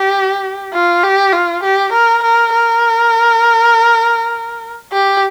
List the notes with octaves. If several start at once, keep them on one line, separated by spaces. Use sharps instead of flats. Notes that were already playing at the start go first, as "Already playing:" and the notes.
Already playing: G4
F4
G4
F4
G4
A#4
A#4
A#4
G4